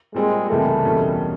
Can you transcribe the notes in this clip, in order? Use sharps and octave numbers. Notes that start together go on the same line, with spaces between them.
A#2 G3 G#3 C4
C#2 C3 E3 G3 A3 A#3
E2 B2 G3 A#3 C#4